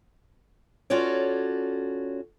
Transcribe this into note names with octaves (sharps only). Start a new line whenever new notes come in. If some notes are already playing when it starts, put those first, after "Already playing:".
C#4 F4 F#4 A4 C#5 D5